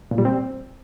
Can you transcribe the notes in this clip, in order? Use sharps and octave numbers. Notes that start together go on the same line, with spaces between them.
A#2
G3
C4